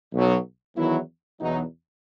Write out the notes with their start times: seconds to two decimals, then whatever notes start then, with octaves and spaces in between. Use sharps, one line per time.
0.13 B1 B2 F#3
0.77 E2 D#3 F#3 E4
1.40 E2 B2 F#3 D#4